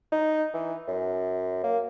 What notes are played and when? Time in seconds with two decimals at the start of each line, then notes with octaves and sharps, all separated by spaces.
0.12 D#4
0.53 E3
0.87 F#2
1.63 A#3